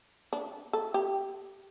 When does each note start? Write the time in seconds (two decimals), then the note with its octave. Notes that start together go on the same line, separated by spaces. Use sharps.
0.33 D4
0.73 A4
0.94 G4